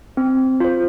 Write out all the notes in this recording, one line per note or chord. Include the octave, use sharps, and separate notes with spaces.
C4
F4 C5